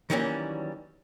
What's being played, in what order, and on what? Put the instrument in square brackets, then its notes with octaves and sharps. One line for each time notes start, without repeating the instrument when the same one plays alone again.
[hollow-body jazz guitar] D#3 E3 F#3 G3 A#3 C#4